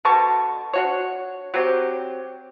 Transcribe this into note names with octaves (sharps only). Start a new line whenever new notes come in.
B2 D3 A5 C#6
D4 F#4 C#5
F#3 C4 G4